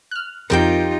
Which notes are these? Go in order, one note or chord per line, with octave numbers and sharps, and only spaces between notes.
F6 F#6
F2 F3 C4 D#4 F4 G4 A#4 G5